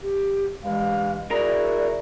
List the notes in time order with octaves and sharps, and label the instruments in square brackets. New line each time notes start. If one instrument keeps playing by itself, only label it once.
[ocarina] G4
[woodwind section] G2 E3 G#3 [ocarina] F5
[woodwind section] E4 F#4 G#4 [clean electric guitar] A#4 [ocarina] D5